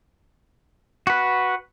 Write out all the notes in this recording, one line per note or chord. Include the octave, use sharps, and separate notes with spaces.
F#4 B4